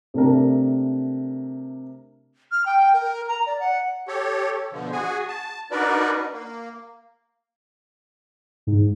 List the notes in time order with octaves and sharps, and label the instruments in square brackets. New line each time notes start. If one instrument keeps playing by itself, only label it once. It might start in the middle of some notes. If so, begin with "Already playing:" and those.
[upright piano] C3 A3 D4 A#4
[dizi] F6
G5
A#4
A#5
D5
F#5
[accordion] G4 A4 C#5
B2 D3 F3
F#4 G#4 G#5
A5
D4 D#4 F#4 A#4 B4 D5
A#3
[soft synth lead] G#2